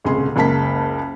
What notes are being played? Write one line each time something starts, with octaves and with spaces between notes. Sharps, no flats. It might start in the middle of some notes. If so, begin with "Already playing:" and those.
D#1 C#2 C3 G#4 C6
F#1 C#2 A#3 A5 B6